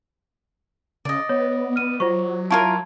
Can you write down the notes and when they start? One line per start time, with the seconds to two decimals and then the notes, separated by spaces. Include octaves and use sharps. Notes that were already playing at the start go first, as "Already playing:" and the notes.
1.05 C#3 D5 D#5
1.29 B3 C#5
1.76 F6 D#7
2.00 F#3 F4 C5 C#6
2.50 E4 F4 A#4 A5 C#6 G#6